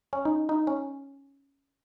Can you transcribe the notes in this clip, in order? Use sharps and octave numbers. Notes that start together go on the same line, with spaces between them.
C#4
D#4
D#4
C#4